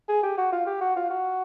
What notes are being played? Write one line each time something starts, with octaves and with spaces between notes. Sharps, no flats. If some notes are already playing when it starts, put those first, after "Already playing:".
G#4
G4
F#4
F4
G4
F#4
F4
F#4